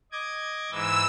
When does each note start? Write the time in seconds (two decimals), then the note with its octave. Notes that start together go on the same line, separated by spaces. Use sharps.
0.12 D#5 D6 G#6
0.71 G#2 E3 E6